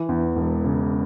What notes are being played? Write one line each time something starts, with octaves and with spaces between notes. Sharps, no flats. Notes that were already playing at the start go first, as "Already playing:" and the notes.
Already playing: E3
E2
E1
C#3